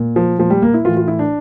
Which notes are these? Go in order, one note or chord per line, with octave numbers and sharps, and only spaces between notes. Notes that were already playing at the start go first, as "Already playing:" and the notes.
Already playing: A#2
F3
A#2 F3
G3
A#3
E4
A2 E3 F4
F4
E4
D4